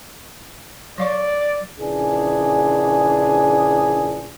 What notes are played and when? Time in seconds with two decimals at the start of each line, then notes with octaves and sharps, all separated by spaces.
0.98 F#3 D5 F5 C#6
1.78 A#1 C#3 E3 D4 G#4